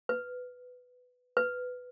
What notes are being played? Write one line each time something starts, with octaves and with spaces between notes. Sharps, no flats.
B4
B4